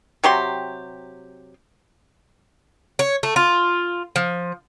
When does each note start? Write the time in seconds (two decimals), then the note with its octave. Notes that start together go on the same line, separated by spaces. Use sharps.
0.24 C3 F#3 G4 C6
2.99 C#5
3.23 A3
3.36 F4
4.16 F3